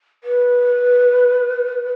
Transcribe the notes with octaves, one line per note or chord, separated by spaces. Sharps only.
B4